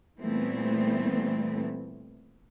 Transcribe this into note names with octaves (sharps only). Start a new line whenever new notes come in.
A#2 E3 G3 A3 B3 C4